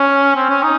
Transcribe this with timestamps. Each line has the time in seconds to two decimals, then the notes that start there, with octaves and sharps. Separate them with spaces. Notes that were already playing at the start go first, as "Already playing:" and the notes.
Already playing: C#4
0.36 C4
0.49 C#4
0.63 D#4